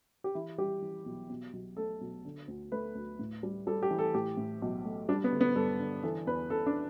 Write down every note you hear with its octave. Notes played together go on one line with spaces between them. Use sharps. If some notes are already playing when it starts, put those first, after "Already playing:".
G4
E3 E4
G3 G4
E3
B1
B2
B1
A3 A4
B1
D3
D2
A3 B4
D2
A2
G3
G3 A4
G4
E3
A4
A2 G4
A2
B1
A3
G3 D4
B3
D3
B3
G2 A4
D3
E3 A4
E2 B4
E2 A4
D4